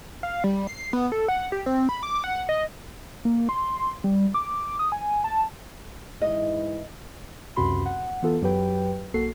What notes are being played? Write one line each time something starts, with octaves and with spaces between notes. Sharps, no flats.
F5
G3
C7
B3
A4
F#5
G4
C4
B5
D6
F#5
D#5
A#3
C6
G3
D6
D#6
G#5
A5
G#2 E3 E4 D#5
C#2 F#2 C3 F#4 B5 C6
F#5
E3 B3 F4 A4
F#2 F#3 G4 B4 G5
B1 A#3 F#4 A4 C7